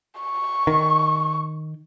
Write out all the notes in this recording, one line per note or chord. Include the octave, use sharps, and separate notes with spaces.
C#6
D#3